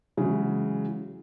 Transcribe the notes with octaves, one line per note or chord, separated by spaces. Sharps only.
C#3 E3 F#3 G#3